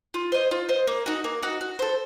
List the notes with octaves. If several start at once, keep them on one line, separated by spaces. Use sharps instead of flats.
F4
C5 D#5
F4
C5 D#5
A#3
D#4 F#4
A#3
D#4 F#4
F#4
A4 C5